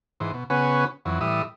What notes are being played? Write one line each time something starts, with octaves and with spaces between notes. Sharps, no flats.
G#2 E3 C5
B2
C#3 B3 C#4 F#4 B4 G#5
F2 E3 F#3
A2 E3 G3 E5 D#6